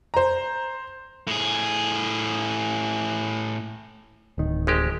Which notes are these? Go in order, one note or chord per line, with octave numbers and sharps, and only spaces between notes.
C5 A#5
A2 G#4
D1 D#3
G#1 G#3 G4